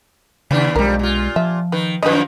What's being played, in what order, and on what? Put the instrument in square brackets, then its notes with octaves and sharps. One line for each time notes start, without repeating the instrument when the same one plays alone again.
[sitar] D#2 D4 [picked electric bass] C#3
[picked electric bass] B1 G#3 [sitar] F2 G3 [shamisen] A#4
[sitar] A#2 F4
[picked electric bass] F3 [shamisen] E5
[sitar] D#3 [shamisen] B4
[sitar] F#2 D#3 F3 [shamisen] B4 D#5